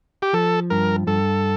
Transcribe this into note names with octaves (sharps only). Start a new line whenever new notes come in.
G4
F3 A4
G2 A#4
G2 A4